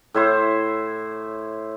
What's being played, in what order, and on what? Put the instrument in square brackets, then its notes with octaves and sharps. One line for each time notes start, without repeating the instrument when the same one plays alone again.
[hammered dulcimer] A2 E4 C5